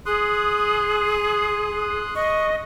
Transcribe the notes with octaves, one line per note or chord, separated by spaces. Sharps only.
G#4 C6 D#6 F#6
D#5 C#6